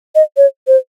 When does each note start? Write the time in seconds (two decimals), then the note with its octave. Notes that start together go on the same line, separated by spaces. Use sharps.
0.15 D#5
0.37 C#5
0.67 C5